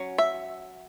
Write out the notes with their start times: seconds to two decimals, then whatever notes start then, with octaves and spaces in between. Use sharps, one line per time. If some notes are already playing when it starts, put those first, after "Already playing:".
Already playing: F#3 C#4
0.18 E5